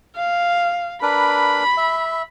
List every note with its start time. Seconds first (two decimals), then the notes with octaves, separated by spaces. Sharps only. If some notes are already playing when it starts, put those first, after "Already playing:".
0.16 F5
1.02 D4 A#4 B4 B5
1.77 E5